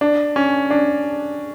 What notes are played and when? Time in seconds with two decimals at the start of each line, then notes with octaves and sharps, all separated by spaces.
0.01 D4
0.36 C#4
0.71 D4